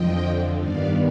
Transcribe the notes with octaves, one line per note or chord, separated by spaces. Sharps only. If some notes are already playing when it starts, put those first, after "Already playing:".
Already playing: F2 D3 F3 D#5 G5
G2 D#3 G3 B3 D5 F5